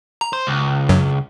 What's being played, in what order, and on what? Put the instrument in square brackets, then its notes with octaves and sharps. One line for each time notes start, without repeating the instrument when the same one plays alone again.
[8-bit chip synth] A#5
[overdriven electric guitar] C5
C#2
[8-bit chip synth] F#2 F#3